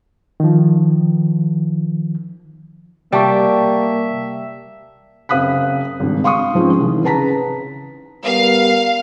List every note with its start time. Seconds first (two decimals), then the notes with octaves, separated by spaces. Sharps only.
0.40 D#3 F3
3.12 C3 G3 A#3 G4 E5 A5 C#6
5.29 F#1 C4 F5 D#6 F#6 B6
6.00 G#1 G2
6.24 F5 C6 C#6 D#6
6.54 G#2 F3 C4 C#4
6.79 C2 D#3 E3
7.03 C#3 B4 A5 A#5 B6
8.24 G3 B3 A#4 F5